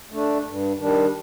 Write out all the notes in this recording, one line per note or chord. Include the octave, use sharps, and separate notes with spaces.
A3 D4
G2
D#3 G3 D4